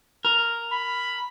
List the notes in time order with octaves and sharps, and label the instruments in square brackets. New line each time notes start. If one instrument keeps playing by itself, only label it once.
[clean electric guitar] A#4
[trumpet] B5